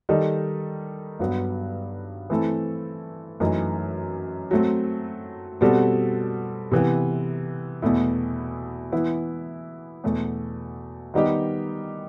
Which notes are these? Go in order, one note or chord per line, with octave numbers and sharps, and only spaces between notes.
D#3 G3 D#4 A4
G2 F#3 B3
E3 A3 C4 E4 A4
F#2 E3 A3 D#4
F#3 A3 C4
B2 G3 C4 F#4 A4
C3 E3 B3
E2 B2 A3 E4
E3 B3 E4
E2 B2 A3
D#3 G3 B3 D#4 G4